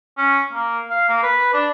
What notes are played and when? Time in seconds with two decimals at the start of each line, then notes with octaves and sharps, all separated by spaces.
0.18 C#4
0.53 A#3
0.90 F5
1.08 A#3
1.23 B4
1.53 D4